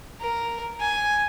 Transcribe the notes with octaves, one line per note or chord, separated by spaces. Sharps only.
A#4
G#5